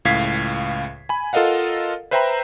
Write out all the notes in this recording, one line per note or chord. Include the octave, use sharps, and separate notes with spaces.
C#2 A2 F5 G#6 B6 C7
G#5 B5
F4 A4 A#4 D#5 F5 F#5
B4 C5 E5 G5 A#5 B5